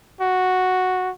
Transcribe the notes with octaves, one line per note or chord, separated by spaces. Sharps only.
F#4